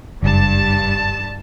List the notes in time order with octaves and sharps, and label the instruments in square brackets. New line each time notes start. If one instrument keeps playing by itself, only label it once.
[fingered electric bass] F#1 [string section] G2 A5